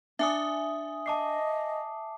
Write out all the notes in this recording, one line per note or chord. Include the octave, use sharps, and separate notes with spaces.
D4 E5 G#5 D#6
D#5 A5 D6 C7